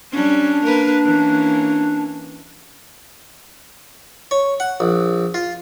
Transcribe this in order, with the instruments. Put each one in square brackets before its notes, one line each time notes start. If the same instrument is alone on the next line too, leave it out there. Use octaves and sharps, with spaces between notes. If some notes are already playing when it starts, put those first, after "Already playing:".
[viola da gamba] G3 C#4 [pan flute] D4
[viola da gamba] A#3 A#4 B4
E3 A#3 C#4
[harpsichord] C#5
F#5
A#1
F4